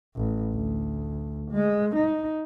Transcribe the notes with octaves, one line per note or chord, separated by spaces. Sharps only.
A1
D2
G#3
D#4